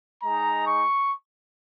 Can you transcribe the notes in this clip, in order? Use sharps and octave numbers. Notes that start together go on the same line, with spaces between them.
G#3 D#4 A#5
C#6